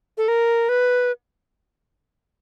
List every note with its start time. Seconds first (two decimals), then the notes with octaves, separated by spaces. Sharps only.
0.18 A4
0.28 A#4
0.69 B4